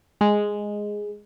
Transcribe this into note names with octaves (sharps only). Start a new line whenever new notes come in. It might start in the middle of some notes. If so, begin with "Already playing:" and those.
G#3